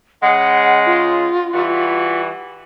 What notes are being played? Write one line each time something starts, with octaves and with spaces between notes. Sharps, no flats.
C#3 G#3 F#5
F4
E3 G3 F#4